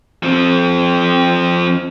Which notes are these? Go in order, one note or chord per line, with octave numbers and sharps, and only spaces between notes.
F3 C4